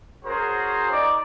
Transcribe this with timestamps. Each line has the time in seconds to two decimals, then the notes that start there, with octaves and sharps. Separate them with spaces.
0.25 C#4 F#4 G#4 A#4 C5
0.91 D#4 D5